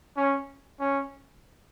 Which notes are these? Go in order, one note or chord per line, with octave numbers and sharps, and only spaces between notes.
C#4
C#4